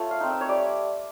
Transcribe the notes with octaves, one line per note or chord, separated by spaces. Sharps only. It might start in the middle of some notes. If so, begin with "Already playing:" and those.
Already playing: A3 F4 C#5
F5
C4 D#4
E5
C#5
G3 D5